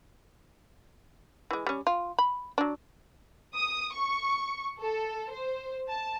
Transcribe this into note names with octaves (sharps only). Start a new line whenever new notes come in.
E3 G#3
G3 C#4
F4
B5
F#3 D4
D#6
C#6
A4
C5
A5